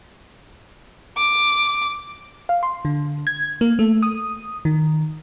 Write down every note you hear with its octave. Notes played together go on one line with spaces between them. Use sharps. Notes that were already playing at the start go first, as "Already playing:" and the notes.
D6
F5
C6
D3
G#6
A#3
A3
D#6
D#3